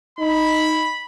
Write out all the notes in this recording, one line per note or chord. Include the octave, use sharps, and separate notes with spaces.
D#4 B5